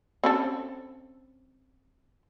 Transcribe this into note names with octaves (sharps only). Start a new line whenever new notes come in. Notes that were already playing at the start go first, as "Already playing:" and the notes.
C4 C#4 A4